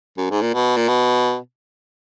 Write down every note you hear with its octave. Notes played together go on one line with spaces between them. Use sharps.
F#2
G#2
A#2
B2
A#2
B2